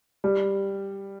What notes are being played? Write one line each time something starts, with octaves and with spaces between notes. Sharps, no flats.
G3